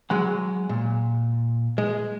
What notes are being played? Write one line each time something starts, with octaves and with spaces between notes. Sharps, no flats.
F#3 G#3 F#5
A#2
G#3